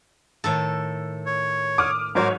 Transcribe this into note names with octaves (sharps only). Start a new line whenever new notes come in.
A2 D#3 A4
C#5
D6 D#6 F6
G#2 F#3 A#4 C5 C#5 D6